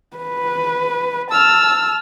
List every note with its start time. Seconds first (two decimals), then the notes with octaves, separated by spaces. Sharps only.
0.17 B4
1.31 A5 E6 F6